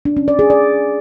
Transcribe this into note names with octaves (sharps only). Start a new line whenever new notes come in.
D4
C#4
D5
G#4
D5